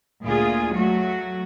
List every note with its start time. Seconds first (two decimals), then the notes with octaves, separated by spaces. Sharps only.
0.23 D2 A#2 F4 G#4
0.72 F#3 A3 F#4